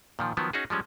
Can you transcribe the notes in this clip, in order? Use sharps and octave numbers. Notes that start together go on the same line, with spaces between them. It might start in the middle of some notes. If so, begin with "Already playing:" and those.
A#2 D#3 F3
D#3 F3 F#3 B3
C#4 D#4 F#4 G#4
F3 G3 G#3 C#4